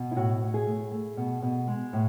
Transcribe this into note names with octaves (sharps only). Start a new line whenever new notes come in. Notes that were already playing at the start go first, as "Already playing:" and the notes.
Already playing: B2
E4
A2 F#4
A2
G#4
A3
A3
B2
B2
G#3
A2